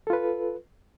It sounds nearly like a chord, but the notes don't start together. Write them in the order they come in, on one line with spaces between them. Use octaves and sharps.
A4 F4 B4